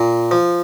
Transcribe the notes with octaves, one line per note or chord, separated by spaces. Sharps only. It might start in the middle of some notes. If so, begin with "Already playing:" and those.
Already playing: A#2
F3